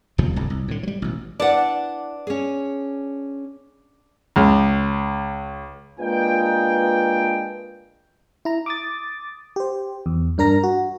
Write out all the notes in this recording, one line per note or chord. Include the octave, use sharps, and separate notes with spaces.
D#1 D2 C3 F3
D1 G1 C2 F2
C2
A2 D3
F#3 G3
A1 B2
D4 E4 B4 D5 F#5
C#4 G#4
C#2
G#3 A#3 D4 F4 B4 G5
E4 A#5
D6 D#6 A6
G4 C5
E2
G2 D4 A#4 A#5 A#6
F#4